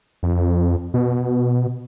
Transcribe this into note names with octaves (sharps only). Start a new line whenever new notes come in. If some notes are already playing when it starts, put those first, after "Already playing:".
F2
B2